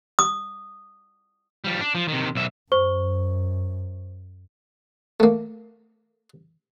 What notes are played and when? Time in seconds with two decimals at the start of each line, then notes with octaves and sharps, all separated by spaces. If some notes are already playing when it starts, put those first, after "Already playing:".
0.19 D#6
1.64 F3 G3
1.80 D4
1.95 F3
2.08 C3 D#3
2.35 B1 E5
2.72 F#2 C5 C#6 G7
5.20 A3 A#3